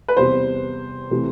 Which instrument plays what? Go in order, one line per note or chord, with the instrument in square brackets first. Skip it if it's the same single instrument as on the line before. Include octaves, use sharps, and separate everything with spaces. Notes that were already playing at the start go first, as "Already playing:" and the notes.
[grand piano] B4
[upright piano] E2 C3 G3 [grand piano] C5
[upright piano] C3 E3 A3